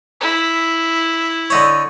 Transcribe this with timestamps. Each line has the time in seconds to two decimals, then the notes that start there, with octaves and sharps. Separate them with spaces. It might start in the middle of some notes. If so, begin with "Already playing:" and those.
0.21 E4
1.50 D3 D#4 C#5